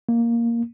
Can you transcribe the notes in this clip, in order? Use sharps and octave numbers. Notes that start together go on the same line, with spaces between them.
A#3